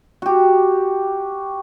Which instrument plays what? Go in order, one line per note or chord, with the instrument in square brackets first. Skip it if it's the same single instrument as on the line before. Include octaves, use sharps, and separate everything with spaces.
[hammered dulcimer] F#4 G4